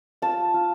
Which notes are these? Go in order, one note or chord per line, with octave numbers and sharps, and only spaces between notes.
F4 A5
F4